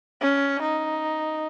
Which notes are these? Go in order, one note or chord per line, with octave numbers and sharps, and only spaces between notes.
C#4
D#4